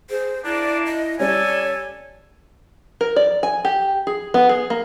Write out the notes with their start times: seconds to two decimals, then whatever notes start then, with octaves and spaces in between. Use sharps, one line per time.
0.10 G#4 C5
0.45 A#3 D4 E4 D5
0.86 D#5
1.20 G3 C#4 A4 C#5 D5 G#5
3.01 A#4
3.16 D5
3.43 G#5
3.65 G4
4.07 G#4
4.34 B3
4.49 G#4
4.70 A#3